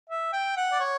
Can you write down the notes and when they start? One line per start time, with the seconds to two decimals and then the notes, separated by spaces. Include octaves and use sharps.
0.09 E5
0.33 G5
0.56 F#5
0.72 D5
0.80 C#5